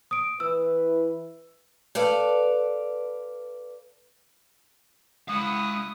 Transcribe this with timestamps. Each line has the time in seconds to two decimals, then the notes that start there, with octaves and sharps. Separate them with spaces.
0.11 D#6 D7
0.40 E3 E4 B4 E6
1.95 A4 B4 D5 F5
5.28 G#3 E4 F5 F#5 D#6